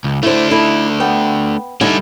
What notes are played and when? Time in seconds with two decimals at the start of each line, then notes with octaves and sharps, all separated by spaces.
0.04 C#2
0.23 A3 D4 E4 C5
0.51 D#4 E4 A4
1.00 B3 G5
1.81 D3 G3 D#4 E4 G#5